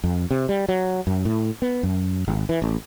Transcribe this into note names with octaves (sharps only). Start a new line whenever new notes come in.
F2
C3
G3
F#3
F#2
A2
B3
F#2
G#1
E3
A1